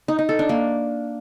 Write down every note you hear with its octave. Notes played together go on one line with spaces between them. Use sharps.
D#4
D#4
A4
D4
A#3